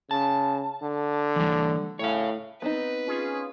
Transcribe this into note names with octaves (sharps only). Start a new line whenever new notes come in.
C#3 A5
D3
E3 G3
A2 C#5 F5
B3 C4 D#4 B4
C#4 F4 G#4